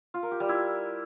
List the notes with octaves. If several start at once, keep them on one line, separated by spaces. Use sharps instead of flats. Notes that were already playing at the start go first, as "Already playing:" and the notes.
F4
A#4
G4
G3
E4